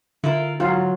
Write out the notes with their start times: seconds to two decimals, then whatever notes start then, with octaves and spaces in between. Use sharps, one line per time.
0.24 D3 E4 F4 A#4
0.60 G#2 F#3 F4